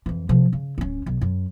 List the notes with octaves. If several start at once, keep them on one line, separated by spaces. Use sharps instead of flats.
F2 E3
C3 F3
C#3
D1 C#4
B1
F#2